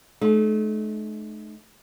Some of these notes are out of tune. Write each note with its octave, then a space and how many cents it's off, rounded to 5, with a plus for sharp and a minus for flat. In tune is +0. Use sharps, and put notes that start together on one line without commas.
A3 -40 D#4 -35